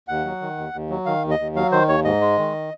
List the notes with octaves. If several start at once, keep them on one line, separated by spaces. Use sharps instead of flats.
D#2 F#5
F#3
D#3
D#2
D#2
F#3
D#3 F5
D#2
D#5
D#2
F#3 F5
D#3 C5
D#2 C#5
G#2 D#5
G#3
D#3